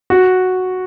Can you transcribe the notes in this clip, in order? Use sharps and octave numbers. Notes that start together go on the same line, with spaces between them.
F#4